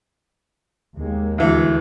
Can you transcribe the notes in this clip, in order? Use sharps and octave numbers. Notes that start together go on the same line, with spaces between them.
D#2 G#3 A#3
D2 E3